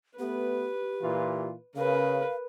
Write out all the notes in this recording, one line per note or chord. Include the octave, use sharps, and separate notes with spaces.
A3 B3 G4 B4
A#2 E3 F4
C#3 A#4 B4 F5